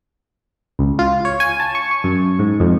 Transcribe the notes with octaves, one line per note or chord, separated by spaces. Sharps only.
C#2
F4
C#5
G#5
A5
C#6
C#6
F#2
G#2
F2